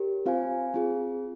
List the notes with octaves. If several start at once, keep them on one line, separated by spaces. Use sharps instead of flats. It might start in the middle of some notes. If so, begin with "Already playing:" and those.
Already playing: G4 A#4 C#5
C4 F4 C5 F5 G#5
C4 F4 G#4